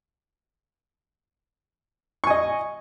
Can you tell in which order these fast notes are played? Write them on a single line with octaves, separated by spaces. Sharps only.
C#6 G#5 D#5